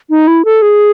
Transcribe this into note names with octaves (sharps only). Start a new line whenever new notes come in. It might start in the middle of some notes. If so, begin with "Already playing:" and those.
D#4
E4
A4
G#4